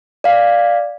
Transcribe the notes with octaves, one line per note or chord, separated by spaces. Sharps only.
D5 F5